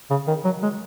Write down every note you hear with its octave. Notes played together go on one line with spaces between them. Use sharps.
C#3
D#3
F#3
G#3